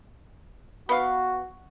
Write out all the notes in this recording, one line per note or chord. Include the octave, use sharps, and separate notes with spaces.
B3 F#4 F5